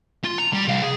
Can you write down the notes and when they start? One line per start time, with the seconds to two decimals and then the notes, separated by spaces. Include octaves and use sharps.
0.24 F4
0.38 A#5
0.53 G3
0.68 C2 F5
0.82 G#4